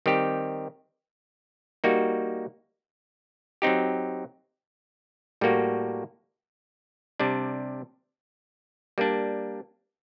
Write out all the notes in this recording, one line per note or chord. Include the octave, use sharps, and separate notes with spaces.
D#3 G3 C4 G4
G3 A#3 D#4 F#4
F#3 C4 D#4 G4
A2 G3 A#3 F#4
C3 G3 D4
G3 A#3 D4